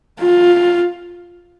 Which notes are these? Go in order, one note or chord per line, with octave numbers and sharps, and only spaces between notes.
F4